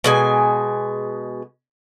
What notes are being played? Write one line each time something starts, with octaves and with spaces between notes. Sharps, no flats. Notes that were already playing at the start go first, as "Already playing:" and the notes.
B2 G#3 G#5